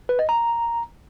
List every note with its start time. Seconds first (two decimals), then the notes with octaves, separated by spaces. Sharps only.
0.09 B4
0.19 D#5
0.29 A#5